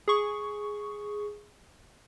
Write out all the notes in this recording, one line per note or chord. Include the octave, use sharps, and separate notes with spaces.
G#4 C#6